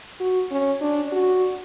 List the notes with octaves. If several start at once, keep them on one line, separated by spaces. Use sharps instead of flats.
F#4
C#4
D4
F#4